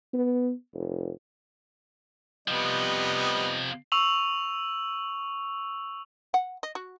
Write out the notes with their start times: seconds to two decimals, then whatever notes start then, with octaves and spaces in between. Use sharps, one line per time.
0.13 B3
0.74 F1
2.48 C3 F3 G3 B3 D#5
3.92 C#6 E6 F7 F#7
6.34 F#5
6.63 D#5
6.75 F#4